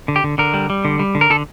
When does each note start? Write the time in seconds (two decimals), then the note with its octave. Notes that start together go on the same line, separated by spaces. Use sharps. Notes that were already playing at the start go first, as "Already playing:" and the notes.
0.08 D3
0.16 G4
0.24 D3
0.38 D3 A#4
0.54 G3
0.70 G3
0.85 D3
0.99 G3
1.15 D3
1.21 A#4
1.30 D3 A4